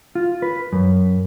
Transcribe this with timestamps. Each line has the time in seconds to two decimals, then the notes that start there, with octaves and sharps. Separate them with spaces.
0.15 F4
0.42 B4
0.73 F#2